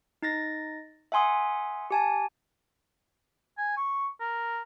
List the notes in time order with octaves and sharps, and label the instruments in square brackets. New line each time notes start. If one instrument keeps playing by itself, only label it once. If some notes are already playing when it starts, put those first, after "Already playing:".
[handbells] D#4 A6 A#6
E5 F#5 G#5 C6 D#6
G4 G#5 A5
[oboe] G#5
C#6
A#4